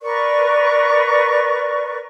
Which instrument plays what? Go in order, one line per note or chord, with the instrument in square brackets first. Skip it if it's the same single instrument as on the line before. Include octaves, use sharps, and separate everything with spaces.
[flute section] A#4 B4 D5 C#6